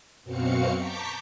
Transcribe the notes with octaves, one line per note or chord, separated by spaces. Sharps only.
F#2 B2 C4 F#4 F5 C#7
A5 A#5 C#6 D6 G6 B6